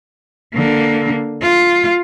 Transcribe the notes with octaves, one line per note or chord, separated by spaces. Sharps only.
D3 A#3
F4